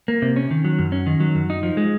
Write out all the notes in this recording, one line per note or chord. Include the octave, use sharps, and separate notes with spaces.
A#3
C3
C#4
D#3
F#3
F#2
C#4
D#3
F#3
F#2
D#4
F3
G#3